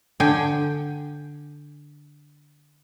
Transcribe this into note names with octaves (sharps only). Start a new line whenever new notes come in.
D3 G5 G#5